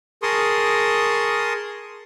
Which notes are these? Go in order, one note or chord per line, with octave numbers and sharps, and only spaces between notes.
G#4 A#4 A5 C6 C#6 D#6